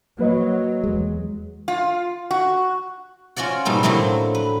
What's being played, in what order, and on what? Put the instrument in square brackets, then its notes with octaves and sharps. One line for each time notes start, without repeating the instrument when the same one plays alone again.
[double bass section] F#3 [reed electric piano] A#3 B4 D#5
[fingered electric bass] E2 G#3
[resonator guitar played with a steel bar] F4
F#4
[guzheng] C#4 F4 F#4 D5 F#5
G#2 B2 G3 A3 A#3
A2 D3 F#3 A3 A#3 C4
B4